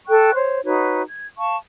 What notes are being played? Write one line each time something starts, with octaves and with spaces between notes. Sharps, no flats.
A4 G5 C#6 F#6
C5 C#5
D#4 F#4 B4 C#5
G#6
F5 A5 C#6